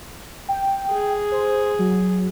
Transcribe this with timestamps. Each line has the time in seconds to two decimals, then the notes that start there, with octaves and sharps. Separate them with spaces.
0.48 G5
0.91 G#4
1.32 C5
1.79 F#3